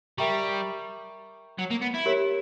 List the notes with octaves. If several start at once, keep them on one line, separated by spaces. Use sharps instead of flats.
G3 A#4 E5 G5 A#5 C#6
F#3
A#3
B3
E4
G4 A#4 C#5